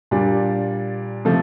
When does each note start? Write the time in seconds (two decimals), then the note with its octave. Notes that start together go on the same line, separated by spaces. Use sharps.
0.11 A#2 G3 D4
1.25 C3 F3 A3